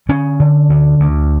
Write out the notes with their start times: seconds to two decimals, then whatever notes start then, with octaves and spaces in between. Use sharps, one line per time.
0.09 D3 C#4
0.40 D3
0.69 D2
1.00 D2